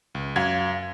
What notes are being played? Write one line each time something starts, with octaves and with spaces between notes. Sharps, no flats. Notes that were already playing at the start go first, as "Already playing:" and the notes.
C#2
F#2 F5 G#6